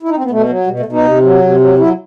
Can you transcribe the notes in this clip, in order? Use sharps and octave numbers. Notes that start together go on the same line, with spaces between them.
E4
D#4
C4
B3
B2 A3
F#3
B2 G3
A3
B2
D#4
C3
F#3
C3
F#3
F#3 E4